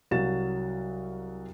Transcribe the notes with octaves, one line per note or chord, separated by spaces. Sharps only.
C2 F#3 F#4 F5 A6 E7